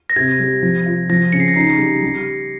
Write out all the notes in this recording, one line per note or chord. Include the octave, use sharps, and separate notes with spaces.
A#6
C3 G#6
G3
F3
F4
F3 A#6
C#3 C#7
C7
A#6
D#4 C7
G3
G3